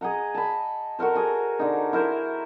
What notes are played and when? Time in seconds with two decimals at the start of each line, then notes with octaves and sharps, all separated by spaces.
0.01 G#4 D#5 F#5 A#5
0.34 A5 B5
0.99 F#4 A4 A#4 C5
1.15 F#4 G#4
1.59 D3 D#4
1.93 E4 A#4 C5